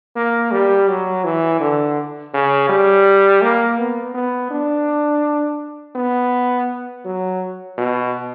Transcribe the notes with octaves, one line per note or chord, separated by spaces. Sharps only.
A#3
G3
F#3
E3
D3
C#3
G3
A#3
B3
B3
D4
B3
F#3
B2